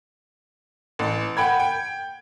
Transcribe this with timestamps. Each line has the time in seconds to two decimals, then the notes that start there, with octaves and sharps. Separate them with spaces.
0.99 A1
1.37 F#5 G5 B5 G#6
1.60 G5